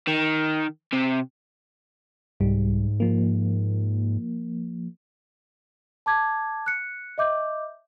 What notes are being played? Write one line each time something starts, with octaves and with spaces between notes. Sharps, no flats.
D#3
C3
C2 G#2 G3
F3 A#3
A5 D6 G#6
F#6 C#7
D#5 E5 D6 G6